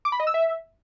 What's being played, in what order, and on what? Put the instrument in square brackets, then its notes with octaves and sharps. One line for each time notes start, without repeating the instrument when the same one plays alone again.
[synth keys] D6
B5
D#5
E6
E5